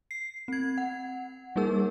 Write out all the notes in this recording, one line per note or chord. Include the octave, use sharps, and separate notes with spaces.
C7
C4 G#6
F#5
G3 A#3 D#4 G#4 A#4 E6